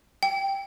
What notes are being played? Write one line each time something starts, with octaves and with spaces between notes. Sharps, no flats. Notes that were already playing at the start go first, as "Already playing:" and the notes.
G5